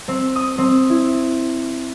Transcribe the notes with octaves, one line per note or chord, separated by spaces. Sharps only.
C4
D#6
C4
E4